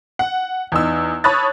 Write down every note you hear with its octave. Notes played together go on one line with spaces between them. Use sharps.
F#5
E2 D#4 E6
C#5 A5 B5 D#6 F#6 A6